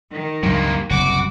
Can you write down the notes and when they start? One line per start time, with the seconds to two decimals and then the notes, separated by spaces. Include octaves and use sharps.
0.14 D#3
0.43 C#2 G2 C3 F#3 A#3
0.90 F#1 C2 F#4 D6